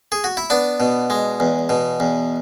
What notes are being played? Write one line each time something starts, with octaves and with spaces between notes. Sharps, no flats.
G#4
F#4
E4
B3 D4
B2
G#3
E2
B2
E2